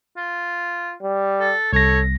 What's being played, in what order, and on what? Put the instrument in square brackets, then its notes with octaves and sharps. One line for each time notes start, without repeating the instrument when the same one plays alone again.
[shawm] F4
[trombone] G3
[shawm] A4
[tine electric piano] C2 A#6 [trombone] A4 [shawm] C#5